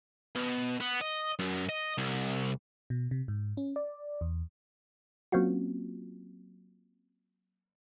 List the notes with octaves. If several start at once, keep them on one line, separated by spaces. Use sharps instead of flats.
B2
B3
D#5
F#2
D#5
C2
B2
C3
G#2
C#4
D5
E2
F#3 A#3 C4 C#4 F4 F#4